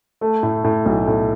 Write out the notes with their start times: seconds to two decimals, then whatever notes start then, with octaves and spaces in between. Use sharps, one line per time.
0.21 A3
0.43 A2
0.64 A2
0.86 B1
1.07 A2